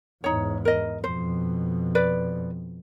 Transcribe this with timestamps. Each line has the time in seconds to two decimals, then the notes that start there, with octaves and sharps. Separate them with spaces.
0.24 E2 G#2 D#4 C#5
0.65 A#4 D#5
1.04 F2 B2 C5
1.95 B4 D5